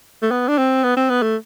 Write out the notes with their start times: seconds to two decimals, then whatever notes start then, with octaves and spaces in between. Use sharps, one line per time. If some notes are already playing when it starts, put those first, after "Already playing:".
0.22 A3
0.31 B3
0.48 D4
0.58 C4
0.83 B3
0.97 C4
1.10 B3
1.22 A3